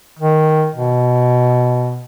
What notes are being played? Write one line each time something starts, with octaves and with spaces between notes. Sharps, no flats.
D#3
B2